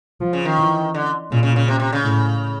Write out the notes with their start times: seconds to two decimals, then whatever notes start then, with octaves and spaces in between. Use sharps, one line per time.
0.21 F3
0.33 C#3
0.45 D#3
0.58 E3
0.94 D3
1.31 A#2 C#3
1.43 C#3
1.56 C#3
1.68 C3
1.80 C3
1.93 C#3
2.05 A2